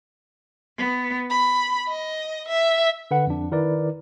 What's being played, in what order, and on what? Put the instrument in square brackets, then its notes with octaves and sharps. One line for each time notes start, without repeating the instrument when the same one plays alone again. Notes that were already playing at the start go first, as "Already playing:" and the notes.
[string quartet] B3
B5
D#5
E5
[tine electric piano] D3 B4 F#5
F2 D4
D#3 E4 A#4 B4 D5